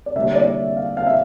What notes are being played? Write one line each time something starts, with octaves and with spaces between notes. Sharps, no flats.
D5
D3 G3 A#3 E5
C#5
D5
F5
F5
E5